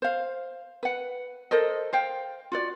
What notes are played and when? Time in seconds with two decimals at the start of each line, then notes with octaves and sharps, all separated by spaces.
0.02 C5 F5
0.83 B4 F#5
1.51 A4 A#4 C5 D#5
1.93 C5 F5 G5
2.52 F4 F#4 D5